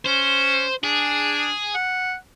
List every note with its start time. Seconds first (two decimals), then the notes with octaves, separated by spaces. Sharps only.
0.06 C#4 C5
0.84 D4 G#4
1.75 F#5